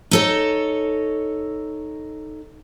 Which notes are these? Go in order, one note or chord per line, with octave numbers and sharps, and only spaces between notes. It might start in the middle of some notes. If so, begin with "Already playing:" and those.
D#4 A4 C#5